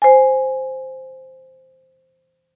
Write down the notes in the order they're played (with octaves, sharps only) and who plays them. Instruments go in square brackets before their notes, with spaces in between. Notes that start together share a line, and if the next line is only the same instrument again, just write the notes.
[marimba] C5 G#5